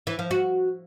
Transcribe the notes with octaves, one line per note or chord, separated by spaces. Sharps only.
E3
F3
F#4